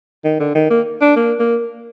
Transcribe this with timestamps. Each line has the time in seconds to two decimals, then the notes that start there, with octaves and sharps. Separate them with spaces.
0.24 D#3
0.40 D3
0.55 D#3
0.70 A#3
1.01 D4
1.16 A#3
1.39 A#3